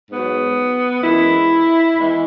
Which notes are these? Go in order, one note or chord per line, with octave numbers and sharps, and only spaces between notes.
G#2 F#3 B3
F#2 E3 G#3 E4
E2 E3 G#3